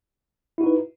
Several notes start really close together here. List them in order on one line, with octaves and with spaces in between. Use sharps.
E4 F#4 D#4 B4